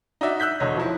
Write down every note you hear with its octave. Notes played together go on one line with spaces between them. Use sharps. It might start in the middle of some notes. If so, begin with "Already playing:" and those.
D#4 F#4 D5 E5
E6 F#6 G6 B6
E1 D3 C#5 D#5
F3 D#4 E4